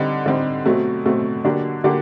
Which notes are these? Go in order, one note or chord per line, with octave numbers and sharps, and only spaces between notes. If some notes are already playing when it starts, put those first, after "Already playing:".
Already playing: D3 G3 C4 D#4
D3 G3 C4 D#4
B2 F#3 A3 C4
B2 F#3 A3 C4
D3 F#3 A#3 D4 G4
D3 F#3 A#3 D4 G4